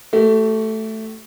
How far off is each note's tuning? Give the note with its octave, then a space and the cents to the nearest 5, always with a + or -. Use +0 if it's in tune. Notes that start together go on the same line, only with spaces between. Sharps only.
A3 +0 G4 -45